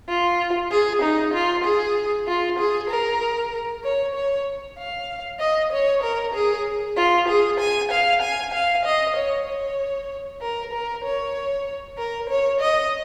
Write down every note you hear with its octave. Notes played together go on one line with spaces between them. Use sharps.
F4
G#4
D#4
F4
G#4
F4
G#4
A#4
C#5
C#5
F5
D#5
C#5
A#4
G#4
F4
G#4
G#5
F5
G#5
F5
D#5
C#5
C#5
A#4
A#4
C#5
A#4
C#5
D#5